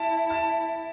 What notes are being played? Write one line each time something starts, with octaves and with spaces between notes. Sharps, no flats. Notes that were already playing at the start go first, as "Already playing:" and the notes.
Already playing: E4 A5
A5